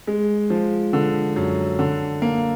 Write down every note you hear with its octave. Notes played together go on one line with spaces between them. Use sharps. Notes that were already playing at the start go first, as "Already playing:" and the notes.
G#3
F3
D3
F#2
D3
A#3